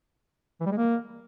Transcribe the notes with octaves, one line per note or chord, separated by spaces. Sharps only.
E3
G3
G#3
A#3